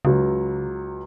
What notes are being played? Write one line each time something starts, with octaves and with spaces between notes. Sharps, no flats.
C#2 C#3 F#3